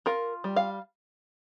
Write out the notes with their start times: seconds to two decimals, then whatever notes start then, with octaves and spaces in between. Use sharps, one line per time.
0.06 F4 A#4
0.44 G3
0.56 F5